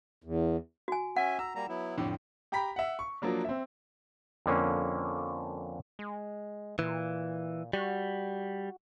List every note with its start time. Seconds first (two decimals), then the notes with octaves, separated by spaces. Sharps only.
0.24 E2
0.88 F#4 G#5
1.16 C#4 E5 F#5 G#5
1.39 A#5 E6
1.55 G3 A#3 A#5
1.69 F#3 B3 E4
1.98 F2 A2 D3 G4
2.52 G4 G5 A#5 B5 B6
2.76 E5 F#5
2.99 C#6
3.22 F3 F#3 A#3 D4
3.45 C4 E5
4.46 F2 D3 A#3 C#4
5.99 G#3
6.79 A#2 E3
7.73 G3 F#4